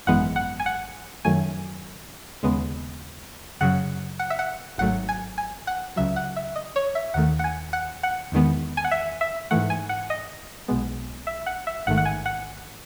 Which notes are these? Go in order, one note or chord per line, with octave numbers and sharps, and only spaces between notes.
G#1 F#2 E3 G#3 B3 F#5
F#5
G#5
F#5
F#2 D#3 F#3 A3 G#5
D#2 C#3 G#3 B3
F#2 C#3 F#3 F#5
F#5
E5
F#5
G#1 G#2 F#3 A3 F#5
G#5
G#5
F#5
C#2 C#3 F#3 E5
F#5
E5
D#5
C#5
E5
D#2 D#3 A3 F#5
F#5
G#5
F#5
F#5
E2 D#3 G#3 B3
G#5
F#5
E5
E5
G#2 E3 A3 F#5
G#5
F#5
D#5
B1 B2 G#3 B3
E5
F#5
E5
A1 G#2 D#3 A3 F#5
F#5
G#5
F#5